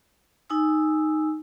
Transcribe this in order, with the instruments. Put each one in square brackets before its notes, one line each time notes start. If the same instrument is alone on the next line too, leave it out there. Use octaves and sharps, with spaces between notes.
[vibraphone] D#4 G#5 E6